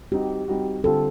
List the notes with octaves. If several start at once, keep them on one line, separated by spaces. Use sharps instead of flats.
G3 C4 D#4 F#4 G4
G3 C4 D#4 F#4
D3 G3 C4 F4 A4